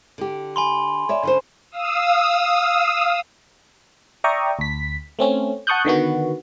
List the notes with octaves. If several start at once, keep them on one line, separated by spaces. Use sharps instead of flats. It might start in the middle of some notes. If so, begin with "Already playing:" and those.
D3 G4
G#5 B5 C6
C#5 D5 E5
D3 C#4 C5
F5 D#6 E6
D5 E5 G5 A#5 C#6 D#6
D2 B6
A3 C4 C#4
F#5 A5 C#6 D#6 F#6 G6
D3 D#3 B3 F#4